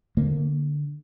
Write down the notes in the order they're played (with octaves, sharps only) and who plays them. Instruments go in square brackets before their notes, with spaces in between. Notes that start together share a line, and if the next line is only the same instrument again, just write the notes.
[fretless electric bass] D3 A#3